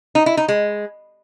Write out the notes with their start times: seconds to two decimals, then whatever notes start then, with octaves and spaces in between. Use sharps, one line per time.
0.15 D#4
0.26 E4
0.37 D#4
0.48 G#3